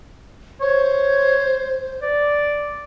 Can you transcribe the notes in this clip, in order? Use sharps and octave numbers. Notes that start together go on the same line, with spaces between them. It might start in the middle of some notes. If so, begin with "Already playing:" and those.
C5 C#5
D5